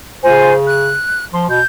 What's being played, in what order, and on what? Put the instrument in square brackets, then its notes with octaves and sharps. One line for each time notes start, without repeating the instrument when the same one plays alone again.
[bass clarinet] C#3 [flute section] F4 C5 G#5
[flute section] F#6
[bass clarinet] F3 [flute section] C6
[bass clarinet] B2 [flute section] G6